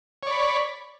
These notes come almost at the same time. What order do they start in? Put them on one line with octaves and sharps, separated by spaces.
C#5 D5 B5